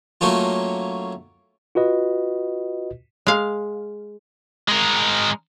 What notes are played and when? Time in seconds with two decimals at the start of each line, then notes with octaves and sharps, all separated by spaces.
0.21 F#3 A3 A#3 C#4 F4
1.75 F4 F#4 B4 D#5
3.27 G#3 F5
4.68 G#3 A#4